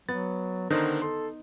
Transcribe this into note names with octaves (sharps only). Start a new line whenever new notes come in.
F#3 B3 A6
D3 D#3 D#4 A#4 C5
A4 C6